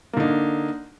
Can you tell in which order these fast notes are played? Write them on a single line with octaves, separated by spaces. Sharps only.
A#3 D3 D#4